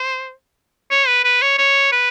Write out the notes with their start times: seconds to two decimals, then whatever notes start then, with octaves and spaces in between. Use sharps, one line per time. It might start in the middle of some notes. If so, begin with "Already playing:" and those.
Already playing: C5
0.91 C#5
1.07 B4
1.24 B4
1.42 C#5
1.58 C#5
1.92 B4